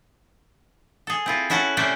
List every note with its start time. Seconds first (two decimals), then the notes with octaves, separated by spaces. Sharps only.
1.07 G#4 A4
1.26 C4 E4 F4
1.50 C#4 E4 F#4 A4 F#5 A5
1.77 C3 A3 C#4 E4 C5 D5